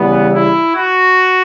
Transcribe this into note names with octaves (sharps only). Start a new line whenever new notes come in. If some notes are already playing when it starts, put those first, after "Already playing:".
Already playing: C#3 E3 G3 B3
E4
F#4